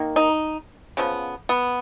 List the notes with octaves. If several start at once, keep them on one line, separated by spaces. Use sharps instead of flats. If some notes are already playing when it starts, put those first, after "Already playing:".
Already playing: D#3 A#3
D#4
C#3 F3 B3
B3